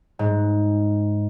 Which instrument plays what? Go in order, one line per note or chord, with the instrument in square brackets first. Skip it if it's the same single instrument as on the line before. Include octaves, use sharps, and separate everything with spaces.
[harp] G#2